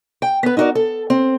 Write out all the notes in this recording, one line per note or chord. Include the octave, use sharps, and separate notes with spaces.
G5
B3 B4
D#4 E4 F#4 A#4 D5
A4
C4